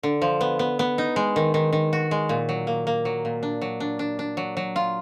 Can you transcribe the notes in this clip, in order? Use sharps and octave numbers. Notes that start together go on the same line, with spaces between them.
D3
F3
B3
B3
B3
D#4
G#3
D#3
D#3
D#3
F#4
G#3
A#2
F#3
A#3
A#3
F#3
A#2
D4
F#3
D4
D4
D4
F#3
F#3
F4